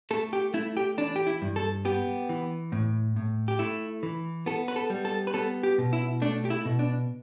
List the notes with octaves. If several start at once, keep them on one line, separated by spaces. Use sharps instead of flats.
A3 A4
G4
A3 E4
G4
E3 D4
G4
E4
G2
A4
B3 G4
E3
A2
A2
G4
A3 E4
E3
B3 A4
B4
A4
G3
A4
B4
B3 A4
G4
B2
E4
A3 D4
G4
E4
B2
D4